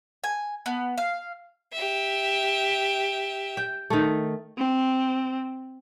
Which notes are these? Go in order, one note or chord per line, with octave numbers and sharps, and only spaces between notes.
G#5
B3
F5
G4 E5
G5
D#3 A3
C4